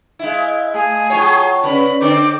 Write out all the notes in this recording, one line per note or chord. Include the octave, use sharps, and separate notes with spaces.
G#3 E4 E5 F5
A3 G#4 F5
F#3 F4 C#5 G5 A5 C#6
C#3 C#4 B4 D5 B5
D3 C4 A4 D6